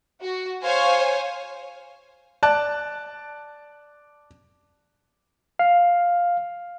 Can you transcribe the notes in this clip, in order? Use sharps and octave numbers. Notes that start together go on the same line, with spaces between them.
F#4
C5 C#5 F5 G#5
D5 A5 F#6
F5